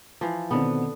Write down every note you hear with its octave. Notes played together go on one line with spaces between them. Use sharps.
E3 F3
B2 D3 D#3 B3 C4